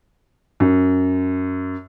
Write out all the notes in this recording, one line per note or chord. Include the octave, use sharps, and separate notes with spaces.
F#2